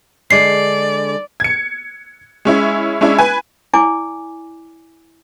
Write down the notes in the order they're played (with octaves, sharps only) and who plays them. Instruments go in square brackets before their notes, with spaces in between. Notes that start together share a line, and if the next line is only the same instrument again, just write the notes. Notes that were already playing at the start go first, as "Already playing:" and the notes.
[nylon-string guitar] D3 G#3 [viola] D5 [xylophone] C7
[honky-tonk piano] G#6 C#7
G#3 C#4 E4
G#3 C#4 D4 E4
B4 G#5
[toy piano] E4 D5 G#5 D6